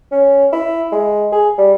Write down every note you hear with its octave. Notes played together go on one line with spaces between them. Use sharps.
C#4
E4
G#3
G#4
G3